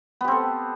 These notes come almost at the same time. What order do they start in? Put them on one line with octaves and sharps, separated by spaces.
B3 G4 C4 A4